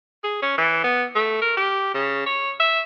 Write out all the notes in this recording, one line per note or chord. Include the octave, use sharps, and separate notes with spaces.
G#4
C#4
E3
B3
A3
A#4
G4
C#3
C#5
E5